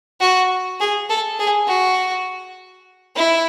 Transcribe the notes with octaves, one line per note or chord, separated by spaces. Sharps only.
F#4
G#4
A4
G#4
F#4
E4